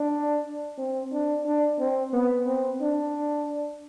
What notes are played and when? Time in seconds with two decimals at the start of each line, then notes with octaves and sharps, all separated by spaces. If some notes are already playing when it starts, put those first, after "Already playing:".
Already playing: D4
0.78 C4
1.12 D4
1.46 D4
1.79 C4
2.13 B3
2.47 C4
2.81 D4